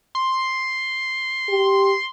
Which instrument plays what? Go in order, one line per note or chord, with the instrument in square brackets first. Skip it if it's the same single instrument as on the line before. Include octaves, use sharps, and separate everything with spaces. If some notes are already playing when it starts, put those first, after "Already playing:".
[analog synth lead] C6
[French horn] G4